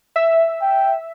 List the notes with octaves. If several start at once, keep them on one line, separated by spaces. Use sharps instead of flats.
E5
G5